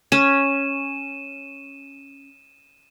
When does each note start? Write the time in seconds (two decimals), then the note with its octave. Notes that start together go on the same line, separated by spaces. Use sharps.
0.12 C#4 D#7 E7